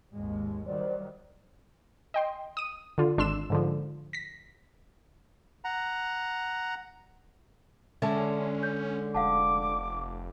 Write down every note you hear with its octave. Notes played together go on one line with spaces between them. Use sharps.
G#1 D#2 G#3
D#3 F#3 G3 C5 D5
D#5 G5 C6
D#6 D#7
D3 F4
G#1 D4 C6 E6 E7
G#2 D3 F3
A#6 B6
F#5 A#5
D3 G#3 C#4 A4 E5 A5
G6
F1 F5 F#5 A5 D6